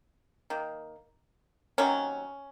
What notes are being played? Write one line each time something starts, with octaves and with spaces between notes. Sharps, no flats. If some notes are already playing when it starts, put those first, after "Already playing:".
D#3 A#3
C3 D#3 F#3 A#3 C#4